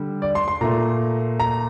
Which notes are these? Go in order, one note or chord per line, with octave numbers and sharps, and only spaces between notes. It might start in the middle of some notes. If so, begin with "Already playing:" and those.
Already playing: D3 G3
D5
C6
C6
A#2 A3 A#5
A#5